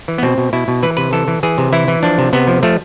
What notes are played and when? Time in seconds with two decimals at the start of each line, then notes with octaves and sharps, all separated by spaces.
0.08 E3
0.18 B3
0.23 B2 C4
0.38 B2
0.53 B2 E4
0.68 B2
0.83 E3 B4
0.97 C3 B4
1.13 E3 A4
1.28 E3
1.43 E3 G#4
1.58 C3
1.72 E3 E4
1.88 E3
2.03 F3 D4
2.18 C3
2.33 C3 B3
2.47 F3
2.63 F3 A3